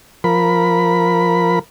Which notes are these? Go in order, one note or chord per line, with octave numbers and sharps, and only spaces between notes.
F3 A#4 B5